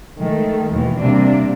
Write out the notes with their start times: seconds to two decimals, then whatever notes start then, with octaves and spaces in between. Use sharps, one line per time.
0.19 D#3 G#3 A3
0.71 D#2 B2 E3
1.00 C3 G3 A#3 D4